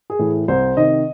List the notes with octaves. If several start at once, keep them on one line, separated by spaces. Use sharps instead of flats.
G#4
A2 E3
C2 C5
C3 D#3 D#5